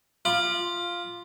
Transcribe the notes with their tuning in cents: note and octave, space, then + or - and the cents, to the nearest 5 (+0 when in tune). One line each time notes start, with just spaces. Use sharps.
F4 +0 B5 -20 D6 +35